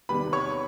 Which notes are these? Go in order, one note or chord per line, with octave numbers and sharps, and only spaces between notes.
E2 C3 D#3 G3 B4 B5
C#5 C#6